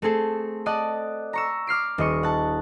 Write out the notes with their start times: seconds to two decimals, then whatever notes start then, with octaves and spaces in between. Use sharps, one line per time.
0.02 A3 C4 G#4 A4
0.66 D5 D#5 F#5 A5
1.33 A#5 C#6 E6
1.67 D6 F6 C7 D7
1.98 D#1 D#5 C#6
2.23 F#5 A5